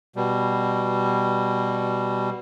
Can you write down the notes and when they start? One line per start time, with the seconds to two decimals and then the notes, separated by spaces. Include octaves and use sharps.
0.16 B2 G3